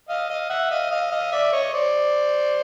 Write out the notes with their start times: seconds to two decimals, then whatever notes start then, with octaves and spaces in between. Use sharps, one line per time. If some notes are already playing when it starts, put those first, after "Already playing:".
0.09 D#5 F5
0.30 D#5 F5
0.50 E5 F#5
0.71 D#5 F5
0.91 D#5 F5
1.11 D#5 F5
1.32 D5 E5
1.52 C#5 D#5
1.73 C5 D5